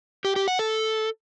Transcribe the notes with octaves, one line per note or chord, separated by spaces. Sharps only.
G4
G4
F#5
A4